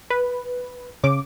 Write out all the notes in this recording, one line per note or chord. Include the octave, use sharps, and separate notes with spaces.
B4
C#3 D6